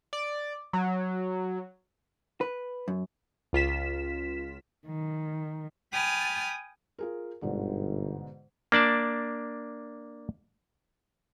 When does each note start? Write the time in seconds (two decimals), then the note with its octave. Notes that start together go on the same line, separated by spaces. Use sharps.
0.13 D5
0.73 F#3
2.41 B4
2.88 F#2
3.53 C#2 F4 B6 E7
4.87 D#3
5.92 G5 G#5 B5 D#6 F6 A6
6.99 F4 G#4 A#4
7.42 G1 G#2 B2 D3
8.72 A#3 D4 D5 A5